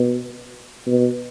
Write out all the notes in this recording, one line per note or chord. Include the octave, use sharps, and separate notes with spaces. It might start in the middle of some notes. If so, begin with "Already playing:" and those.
Already playing: B2
B2